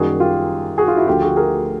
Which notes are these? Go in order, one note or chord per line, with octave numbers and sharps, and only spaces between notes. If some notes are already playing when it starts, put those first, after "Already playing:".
Already playing: F#2 D#3 G3 A#3 F#4 G#4
F4 G4
F#4 G#4
F4
E4 F#4
D2 D3 F3 A3 F4 G4
F#4 G#4
G#4 A#4